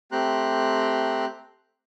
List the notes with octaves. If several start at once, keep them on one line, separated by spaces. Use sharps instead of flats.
A3 C4 G4 A#5 C6 F#6